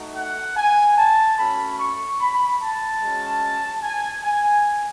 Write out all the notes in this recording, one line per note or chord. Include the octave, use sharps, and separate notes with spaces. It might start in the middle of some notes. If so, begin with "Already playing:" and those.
Already playing: A3 D#4 F#4
F#5
G#5
A5
A3 C#4 F#4 B5
C#6
B5
A5
G#3 C#4 F#4
G#5
G#5